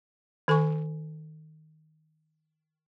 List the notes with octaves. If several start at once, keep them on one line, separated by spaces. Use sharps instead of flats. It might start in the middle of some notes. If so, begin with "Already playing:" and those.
D#3 A4 G#5 C#6